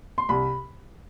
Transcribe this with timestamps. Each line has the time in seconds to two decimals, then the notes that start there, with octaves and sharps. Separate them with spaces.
0.18 C6
0.29 C2 B5